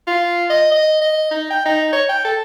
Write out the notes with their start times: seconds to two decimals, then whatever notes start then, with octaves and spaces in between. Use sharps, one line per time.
0.07 F4
0.50 D#5
0.72 D#5
1.01 D#5
1.31 D#4
1.50 G5
1.65 D#4
1.93 C#5
2.09 G5
2.25 A4